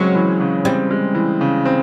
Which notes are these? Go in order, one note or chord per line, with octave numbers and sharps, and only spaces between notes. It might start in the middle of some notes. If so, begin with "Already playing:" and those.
Already playing: C#3 F#3 G#3 C4
E3
C#3
G3 C4
G#3
E3
C#3
C4